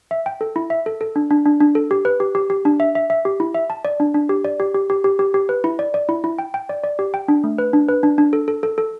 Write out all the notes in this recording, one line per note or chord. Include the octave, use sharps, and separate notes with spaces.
E5
G5
A4
E4
E5
A4
A4
D4
D4
D4
D4
A4
G4
B4
G4
G4
G4
D4
E5
E5
E5
G4
E4
E5
A5
D5
D4
D4
G4
D5
G4
G4
G4
G4
G4
G4
B4
E4
D5
D5
E4
E4
G5
G5
D5
D5
G4
G5
D4
A3
B4
D4
B4
D4
D4
A4
A4
A4
A4